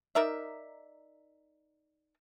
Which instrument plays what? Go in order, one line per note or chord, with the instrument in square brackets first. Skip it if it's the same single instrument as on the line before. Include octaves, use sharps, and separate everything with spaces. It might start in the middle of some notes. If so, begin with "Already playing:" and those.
[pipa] D#4 A#4 D5 E5